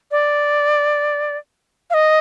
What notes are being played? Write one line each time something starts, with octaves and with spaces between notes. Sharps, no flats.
D5
F5
D#5